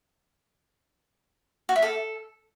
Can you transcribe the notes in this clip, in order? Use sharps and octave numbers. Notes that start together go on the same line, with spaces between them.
F#4
E5
A4